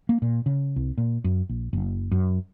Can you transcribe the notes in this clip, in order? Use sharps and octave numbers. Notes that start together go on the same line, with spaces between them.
A#3
A#2
C#3
C2
A#2
F#2
A#1
F#1
F#2